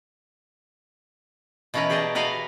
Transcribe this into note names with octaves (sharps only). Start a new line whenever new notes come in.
B2 E3 C#4 E4 A#4 B4
G4 G#4 D5 D#5 A5
F#4 A#4 B4 D#5 F5